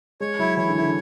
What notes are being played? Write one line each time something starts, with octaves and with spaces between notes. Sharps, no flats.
G#3 C#5
F#3 E4
E3 C#5
D3
E4
D3